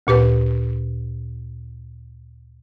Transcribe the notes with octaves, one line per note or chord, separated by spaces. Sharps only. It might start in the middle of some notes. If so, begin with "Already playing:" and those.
D2 A#2 G4 B4